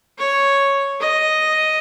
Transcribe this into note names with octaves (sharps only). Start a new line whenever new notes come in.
C#5
D#5